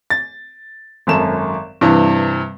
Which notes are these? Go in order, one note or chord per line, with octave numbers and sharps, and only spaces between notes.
A6
G#1 F#2 A4 E7
G2 C3 E3